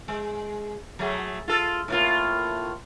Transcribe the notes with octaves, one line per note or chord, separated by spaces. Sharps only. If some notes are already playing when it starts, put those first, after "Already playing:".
G#3
F#3 A3 G#4
F4 A4
A2 A#3 F4